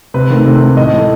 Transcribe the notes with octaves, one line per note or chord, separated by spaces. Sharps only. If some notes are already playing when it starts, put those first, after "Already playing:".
C3 B4
D#3 A3
C3
D#3 A3
A2 D#5
E3 A3